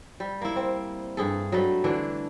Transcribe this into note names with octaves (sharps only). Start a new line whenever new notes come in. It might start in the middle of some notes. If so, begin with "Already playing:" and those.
G3
A#3 E4
C4
G2 G#4 A4
F#3 G3 A3
D3 E3 D4